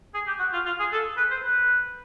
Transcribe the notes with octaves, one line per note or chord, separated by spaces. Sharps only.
G#4
G4
F#4
F4
F4
G#4
A4
B4
C5
B4